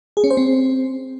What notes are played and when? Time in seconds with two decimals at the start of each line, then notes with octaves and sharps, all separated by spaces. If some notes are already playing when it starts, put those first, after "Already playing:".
0.17 G#4
0.24 C#4
0.30 C5
0.37 C4